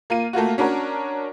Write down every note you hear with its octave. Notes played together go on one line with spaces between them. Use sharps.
A#3 F4 D#7
A3 A#3 F4 F#4
C#4 D4 F#4 A#4 C#5